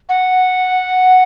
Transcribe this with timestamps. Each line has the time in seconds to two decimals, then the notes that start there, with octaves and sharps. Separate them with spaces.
0.09 F#5